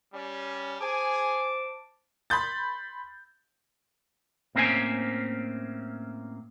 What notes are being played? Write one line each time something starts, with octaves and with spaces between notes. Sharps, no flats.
G3 C#4
G#4 C5 G#5 A5 D6
B5 C6 G6 A6
A2 A#3 C4 C#4 C5 G#5